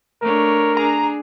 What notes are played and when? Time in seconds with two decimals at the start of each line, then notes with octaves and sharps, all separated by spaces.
0.22 A3 D4 A#4 C#5
0.77 D4 G#4 A#5